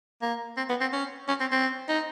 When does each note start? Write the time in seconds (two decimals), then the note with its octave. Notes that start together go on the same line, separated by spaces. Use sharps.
0.22 A#3
0.57 C4
0.69 B3
0.81 C4
0.93 C#4
1.28 C#4
1.40 C4
1.52 C4
1.89 D#4